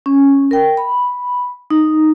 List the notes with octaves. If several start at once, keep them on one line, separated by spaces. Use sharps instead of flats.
C#4
A#4 G5
B5
D#4